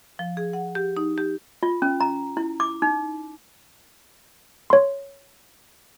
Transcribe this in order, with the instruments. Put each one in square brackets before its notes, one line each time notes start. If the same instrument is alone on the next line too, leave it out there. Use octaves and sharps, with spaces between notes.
[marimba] F3
G#4
F#5
G4
D#4
G4
[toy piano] F4
C#4
A#5
E4
D6
D#4
[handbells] C#5 C6